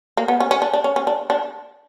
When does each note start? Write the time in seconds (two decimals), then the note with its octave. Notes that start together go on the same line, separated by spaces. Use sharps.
0.17 A#3
0.28 B3
0.40 C#4
0.51 C#4
0.62 D4
0.73 D4
0.84 C#4
0.96 C#4
1.07 D4
1.30 D4